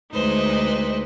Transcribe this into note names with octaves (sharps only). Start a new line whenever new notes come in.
D2 G#3 D#4 B4 C5